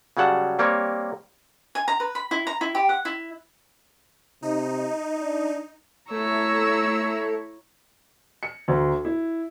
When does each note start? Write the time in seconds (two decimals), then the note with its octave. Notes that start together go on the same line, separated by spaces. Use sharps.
0.17 C#3 F#3 G3 F#5 A5
0.59 G3 A#3 C4 C#5
1.75 G#5
1.88 A#5
2.00 B4
2.15 B5
2.31 E4
2.47 A#5
2.61 E4
2.75 G4
2.89 F#5
3.05 E4
4.42 C3 D#4
5.19 D4
6.10 A3 E4 C#5 A#5 E6
8.43 C#7
8.68 D2
9.05 E4